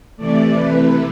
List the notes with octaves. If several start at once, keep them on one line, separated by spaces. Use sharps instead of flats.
C3 E3 A3 D5
B4